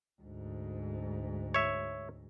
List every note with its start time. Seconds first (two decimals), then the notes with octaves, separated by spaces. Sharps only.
0.22 D2 G#2
1.54 C#5 E5